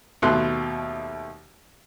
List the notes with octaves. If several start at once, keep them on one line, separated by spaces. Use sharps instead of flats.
D#2 B2 A3 C6 F#6